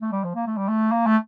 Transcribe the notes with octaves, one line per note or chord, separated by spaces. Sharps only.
A3
G3
F3
A#3
A3
G3
A3
A#3
A3